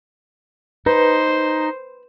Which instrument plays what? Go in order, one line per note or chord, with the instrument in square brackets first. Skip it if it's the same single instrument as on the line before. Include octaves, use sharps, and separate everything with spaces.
[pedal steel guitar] D#4 [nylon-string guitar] B4 [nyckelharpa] C5